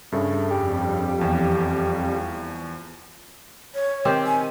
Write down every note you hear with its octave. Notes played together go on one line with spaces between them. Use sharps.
G2 C#3 A3
F2 G3 G4
E2 F3
C#5
D#3 C4 G4
G#5